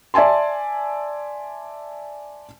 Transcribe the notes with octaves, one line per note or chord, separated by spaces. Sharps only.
D5 E5 G#5 A5 C6